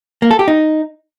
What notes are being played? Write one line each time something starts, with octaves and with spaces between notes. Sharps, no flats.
A#3
A4
G4
D#4